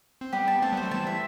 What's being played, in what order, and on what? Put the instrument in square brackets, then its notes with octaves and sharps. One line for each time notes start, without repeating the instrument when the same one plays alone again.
[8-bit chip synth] C4
[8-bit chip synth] G3 B3 [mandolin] G4
[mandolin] A5
[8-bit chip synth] A3 C4 [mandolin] A5
[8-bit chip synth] G3 B3
[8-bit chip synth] F#3 A3 [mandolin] C5
[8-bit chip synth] E3 G3 [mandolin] A5
[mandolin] E5